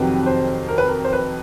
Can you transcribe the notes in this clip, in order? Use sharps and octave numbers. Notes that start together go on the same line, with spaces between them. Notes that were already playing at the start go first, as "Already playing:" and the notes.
Already playing: F2 C3 D#3 F#3 B4
C5
A#4
B4
A#4
C5
B4